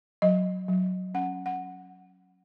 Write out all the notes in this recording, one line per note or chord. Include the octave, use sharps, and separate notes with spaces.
F#3 D#5
F#3
C#4 F#5
F#5